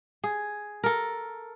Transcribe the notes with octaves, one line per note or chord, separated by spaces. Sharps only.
G#4
A4 A#4